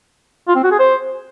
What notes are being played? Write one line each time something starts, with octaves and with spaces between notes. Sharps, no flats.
F4
C4
F#4
G#4
C5